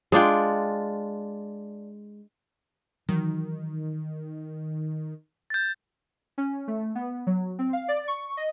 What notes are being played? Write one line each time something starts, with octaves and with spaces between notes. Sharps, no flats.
G#3 D4 F4 G5
D#3 E3 F#3
G6 A6
C#4
A3
B3
F#3
C4
F5
D5
C#6
D#5